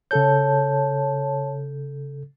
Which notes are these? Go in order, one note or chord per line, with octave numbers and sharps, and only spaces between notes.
C#3 A4 C#5 A5 G6